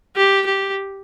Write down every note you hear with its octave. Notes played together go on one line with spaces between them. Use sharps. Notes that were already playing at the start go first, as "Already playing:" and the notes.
G4
G4